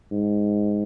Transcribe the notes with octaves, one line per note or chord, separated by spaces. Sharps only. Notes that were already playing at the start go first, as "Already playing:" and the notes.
G#2